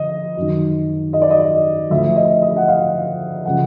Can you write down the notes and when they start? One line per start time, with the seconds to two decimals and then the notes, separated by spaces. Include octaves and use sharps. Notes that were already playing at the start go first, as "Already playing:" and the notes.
Already playing: D3 F3 D#5
0.37 F#2 D#3
1.13 D#5
1.22 D5
1.30 D#5
1.90 D2 D3 F3 E5
2.16 D#5
2.42 D#5
2.57 F#5
2.68 F5
3.45 C#3 F3 F#5